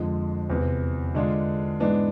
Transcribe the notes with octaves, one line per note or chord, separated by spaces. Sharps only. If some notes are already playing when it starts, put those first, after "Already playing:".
Already playing: F2 D3 F3 G#3
E2 C3 E3 B3
D3 G#3 D4 F4
G#2 E3 G#3 B3 D4